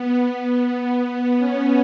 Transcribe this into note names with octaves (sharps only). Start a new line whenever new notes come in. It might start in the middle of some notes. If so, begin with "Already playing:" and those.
Already playing: B3
B3
C#4